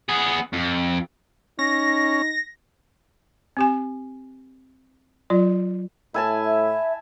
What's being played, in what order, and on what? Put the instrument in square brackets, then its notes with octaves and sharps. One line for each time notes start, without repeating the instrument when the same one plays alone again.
[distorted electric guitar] B3 G#4
F2
[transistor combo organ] C#4 [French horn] D#4 [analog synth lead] A#6
[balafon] C4 G4 G#5
F#3 F4 D5
[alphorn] A2 [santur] E4 G#5 A5
[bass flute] E5